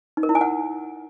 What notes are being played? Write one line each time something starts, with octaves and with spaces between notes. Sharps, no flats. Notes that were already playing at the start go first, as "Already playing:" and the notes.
D#4
A#4
E4
G#5
F#5